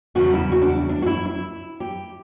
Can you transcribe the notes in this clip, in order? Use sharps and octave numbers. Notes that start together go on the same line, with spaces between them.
E2 C#3 G3 F#4
E4
F#4
D4
E4
D4
F#4
E4
E4
G4